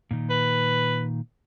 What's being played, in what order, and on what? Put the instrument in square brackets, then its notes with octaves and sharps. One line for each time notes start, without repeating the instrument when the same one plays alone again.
[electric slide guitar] A#2 D#3
[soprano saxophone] B4